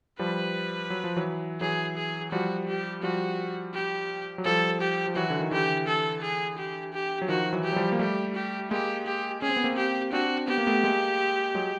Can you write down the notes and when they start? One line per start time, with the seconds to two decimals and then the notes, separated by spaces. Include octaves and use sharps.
0.19 F3 G3 B4
0.90 F#3
1.04 F3
1.16 E3 F#3
1.61 E3 F#3 G#4
1.97 G#4
2.32 F3 G3 F#4
2.68 G4
3.03 F3 G3 F#4
3.74 G4
4.38 F#3
4.45 F3 G3 A4
4.81 G4
5.07 F3
5.16 E3 F#3 F#4
5.30 D3
5.40 D#3
5.51 D3 E3 G4
5.88 A4
6.22 G#4
6.59 G4
6.94 G4
7.22 F#3
7.28 D#3 F3 F#4
7.53 E3 F#3
7.64 G4
7.72 F#3
7.76 F3 G3
7.92 A#3
7.99 G3 A3 G4
8.35 G4
8.71 G#3 A#3 G4
9.06 G4
9.42 C#4 G#4
9.49 C4
9.57 B3
9.64 A#3 C4
9.77 G4
10.13 C4 D4 F#4
10.48 B3 G4
10.58 A#3
10.67 A3 B3
10.83 G#3 A#3
11.55 F#3 G#3